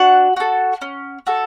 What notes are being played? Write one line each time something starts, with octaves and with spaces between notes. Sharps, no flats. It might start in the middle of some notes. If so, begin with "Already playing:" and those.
Already playing: D4 F#4 F#5
F#4 A4
C#4
F#4 A4